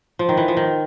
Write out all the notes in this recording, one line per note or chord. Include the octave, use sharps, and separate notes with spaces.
F3
D#3
E3
F3
D#3